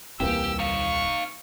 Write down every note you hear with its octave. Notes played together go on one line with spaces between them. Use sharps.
D#1 C2 C3 E3 A#3 G4 E6
D#4 F5 C#6